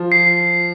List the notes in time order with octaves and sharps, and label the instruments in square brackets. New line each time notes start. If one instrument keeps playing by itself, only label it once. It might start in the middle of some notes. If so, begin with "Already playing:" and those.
Already playing: [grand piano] F3
[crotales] C7